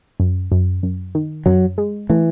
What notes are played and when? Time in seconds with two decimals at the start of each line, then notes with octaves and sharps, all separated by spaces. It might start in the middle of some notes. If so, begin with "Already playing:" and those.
0.20 F#2
0.52 F#2
0.83 F#2
1.15 D#3
1.46 F#2 F#3
1.78 G#3
2.10 E3 A3